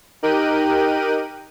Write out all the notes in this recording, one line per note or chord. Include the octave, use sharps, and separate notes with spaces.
D#4 G4 A#4 G5 F#6 D#7